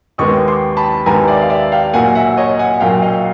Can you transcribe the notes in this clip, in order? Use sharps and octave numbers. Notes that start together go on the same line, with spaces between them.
D#2 D#3 G#3 B3 C#6 D#6
C6 D6
A5 B5
D#2 D#3 G#3 B3 G#5 A#5
D5 E5
F5
D5 E5
F5 G5
B1 A#2 F#3 A#3 F#5 G#5
E5 F#5
C#5 D#5
F#5 G#5
B1 A#2 F#3 A#3 F5 G5
D#5 F5